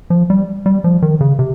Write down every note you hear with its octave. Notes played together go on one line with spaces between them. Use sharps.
F3
G3
G3
F3
D#3
C#3
C3